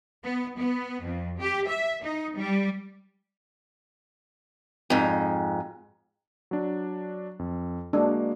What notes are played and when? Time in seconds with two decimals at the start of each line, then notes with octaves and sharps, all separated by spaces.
0.24 B3
0.58 B3
1.04 F2
1.40 G4
1.69 E5
2.04 D#4
2.37 G3
4.90 F2 G#2
6.51 F#3 D4
7.39 F2
7.93 G#3 A#3 D4 F#4